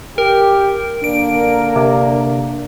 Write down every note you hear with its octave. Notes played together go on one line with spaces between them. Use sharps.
G4 A#4
D3 A#3 D4 A#4 D7
C3